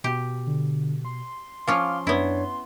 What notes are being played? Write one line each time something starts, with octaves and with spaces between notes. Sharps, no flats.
B2 G4
D3
C6
F3 C#4 F4 F5 D6 F6
F#2 B3 D4 E4 C#5